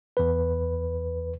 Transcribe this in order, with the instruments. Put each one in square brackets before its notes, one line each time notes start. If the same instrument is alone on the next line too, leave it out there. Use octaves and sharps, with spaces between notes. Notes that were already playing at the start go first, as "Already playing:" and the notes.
[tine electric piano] E2 B4